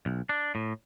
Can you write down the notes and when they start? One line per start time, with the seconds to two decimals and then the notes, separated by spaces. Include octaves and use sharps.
0.06 B1
0.29 D4
0.55 A2